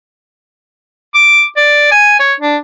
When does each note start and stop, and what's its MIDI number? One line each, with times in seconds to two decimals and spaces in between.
1.15 1.44 86
1.57 1.90 74
1.91 2.16 80
2.20 2.34 73
2.40 2.57 62